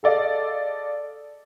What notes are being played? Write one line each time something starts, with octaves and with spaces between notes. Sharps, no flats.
G#4 A4 D5 D#5 F5